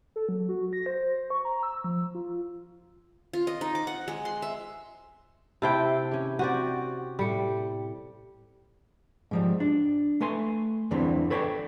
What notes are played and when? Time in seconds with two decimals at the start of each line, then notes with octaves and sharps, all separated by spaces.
0.16 A4
0.29 F#3
0.49 F#4
0.73 A#6
0.86 C5
1.16 C5
1.30 C#6
1.45 A#5
1.63 E6
1.84 F3
2.15 F4
3.33 F4
3.47 D#5
3.61 D#4
3.75 D6
3.87 F#5
4.08 G#3
4.25 C6
4.42 E5
5.62 C3 E4 C5 E5 G5 A5
6.11 C#4 G4
6.39 C4 F#4 G4 D5 D#7
7.19 A2 G3 C#7
9.31 G#2 F3 G3
9.60 D4
10.21 A3 B4 G#5 C6
10.91 E2 G2 D3 E3 B3 C4
11.30 A4 B4 C#5 D5 G5